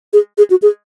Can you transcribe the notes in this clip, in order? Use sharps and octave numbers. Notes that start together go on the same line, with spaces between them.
G#4
G#4
F#4
G#4